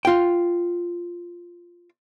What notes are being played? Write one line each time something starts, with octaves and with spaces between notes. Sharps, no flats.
F4 G5